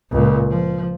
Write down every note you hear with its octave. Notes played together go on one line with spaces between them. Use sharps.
C#2 A#2
F3